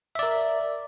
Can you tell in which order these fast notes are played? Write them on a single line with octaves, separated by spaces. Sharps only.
E5 D5 A#4